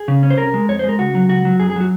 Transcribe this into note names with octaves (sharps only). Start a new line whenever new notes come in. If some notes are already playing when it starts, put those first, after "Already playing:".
Already playing: G#4
C#3
C#4
C5
C2 A#4
G#3
F2 C#5
C5
G#3
A#4
C#2 F#4
F#3
C#2 F#4
F#3
F#2 G#4
G#4
F#3 F#4